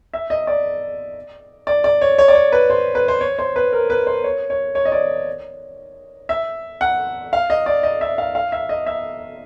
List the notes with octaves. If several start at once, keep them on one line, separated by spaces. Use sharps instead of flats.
E5
D#5
D5
D5
D5
C#5
C#5
D5
C#5
B4
C5
B4
C5
C#5
C5
B4
A#4
B4
C5
C#5
C#5
C#5
D#5
D5
E5
F#5
F5
D#5
D5
D#5
E5
F5
F5
E5
D#5
E5